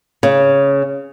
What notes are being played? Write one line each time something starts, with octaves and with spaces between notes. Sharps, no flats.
C#3